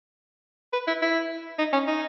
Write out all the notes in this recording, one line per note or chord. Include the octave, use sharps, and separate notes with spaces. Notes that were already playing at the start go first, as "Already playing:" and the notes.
B4
E4
E4
D#4
C#4
D#4